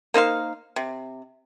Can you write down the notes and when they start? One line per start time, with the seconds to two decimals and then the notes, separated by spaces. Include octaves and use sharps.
0.14 A#3 D#4 C5 F5
0.76 C3